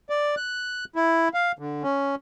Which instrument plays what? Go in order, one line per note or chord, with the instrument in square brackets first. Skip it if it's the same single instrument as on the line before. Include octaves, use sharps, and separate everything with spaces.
[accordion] D5
F#6
E4
F5
D3
C#4